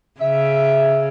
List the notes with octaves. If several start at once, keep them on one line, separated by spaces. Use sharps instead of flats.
C#3 E5